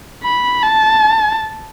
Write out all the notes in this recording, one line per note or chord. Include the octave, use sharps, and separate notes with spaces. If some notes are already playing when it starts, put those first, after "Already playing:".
B5
A5